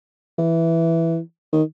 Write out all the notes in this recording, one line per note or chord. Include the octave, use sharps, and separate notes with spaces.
E3
D#3